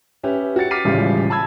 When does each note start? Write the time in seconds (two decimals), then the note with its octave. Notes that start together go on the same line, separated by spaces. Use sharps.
0.23 C#4 G4 B4 E5
0.56 F#4 G4 A6 C#7
0.71 D6 F6 A6 B6 C7 D#7
0.85 D#1 A1 C#3 G3 G#3 F4
1.30 A5 B5 E6 G#6